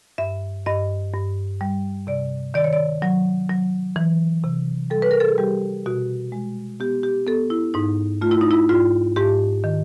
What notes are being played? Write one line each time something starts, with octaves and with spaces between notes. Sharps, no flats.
G2 E5
G2 D#5
G2
G3
C3 D5
D#3 D5
C#5
D5
F#3
F#3
E3
C3
G3 A4
B4
A#4
A4
G#4
G3 G4
B2 F#4
G#3
B3 G4
G4
B3 A4
E4
G#2 D#4
A3 F4
E4
D#4
E4
G#2 F4
G#2 G4
D#3